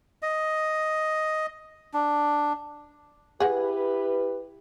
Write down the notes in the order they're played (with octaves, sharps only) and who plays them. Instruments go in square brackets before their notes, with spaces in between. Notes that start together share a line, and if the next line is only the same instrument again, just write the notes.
[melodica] D#5
D4
[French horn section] E4 G4 B4 [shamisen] G#4 F#5